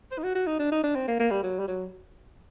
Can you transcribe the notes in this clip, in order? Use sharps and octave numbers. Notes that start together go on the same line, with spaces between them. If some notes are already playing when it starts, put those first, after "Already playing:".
C5
D#4
F#4
F#4
D#4
D4
D#4
D4
C4
A#3
A#3
G3
F#3
G3
F#3